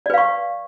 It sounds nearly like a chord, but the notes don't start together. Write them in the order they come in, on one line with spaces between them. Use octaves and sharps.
D5 B4 F5 C#6